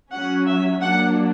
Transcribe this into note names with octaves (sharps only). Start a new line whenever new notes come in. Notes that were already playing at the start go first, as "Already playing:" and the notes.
F#3 C#4 F#5
E5
F#3 A#3 D4 F#5